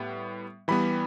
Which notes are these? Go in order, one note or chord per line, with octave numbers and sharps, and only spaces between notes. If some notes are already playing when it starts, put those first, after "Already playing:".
Already playing: A2 G3 B3
E3 G3 B3 B5